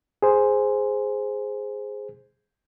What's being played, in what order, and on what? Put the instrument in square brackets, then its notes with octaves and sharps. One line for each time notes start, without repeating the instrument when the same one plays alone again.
[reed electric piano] G#4 C5